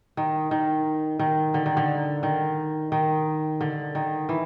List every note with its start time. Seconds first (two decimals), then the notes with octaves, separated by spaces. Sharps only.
0.17 D#3
0.51 D#3
1.19 D#3
1.54 D3
1.66 D#3
1.77 D3
2.23 D#3
2.92 D#3
3.61 D3
3.95 D#3
4.29 E3